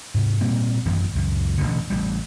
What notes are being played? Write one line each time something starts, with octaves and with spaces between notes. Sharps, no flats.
G#2 C3
A#2 G3 A#3 C4
A1 F#2 D#3 E3
C#2 F#2
A1 G#2 B2 D3
A1 G3